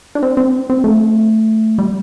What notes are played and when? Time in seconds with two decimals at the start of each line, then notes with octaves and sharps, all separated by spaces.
0.15 D4
0.23 C4
0.37 C4
0.70 C4
0.84 A3
1.79 G3